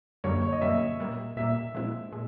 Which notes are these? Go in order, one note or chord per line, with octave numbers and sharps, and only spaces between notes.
F#2 D3 G3 A#3 C#5
C#5
D#5
F#2 D3 G3 A#3 E5
A#2 G3 A#3
A#2 G3 A#3 E5
A#2 F3 G#3 C4 E4
A#2 G#3